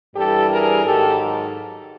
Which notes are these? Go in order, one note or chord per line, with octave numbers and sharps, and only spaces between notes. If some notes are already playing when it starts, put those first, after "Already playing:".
G2 E3 G3 G4 A4
G#4 A#4
G#2 D#3 F#3 G4 A4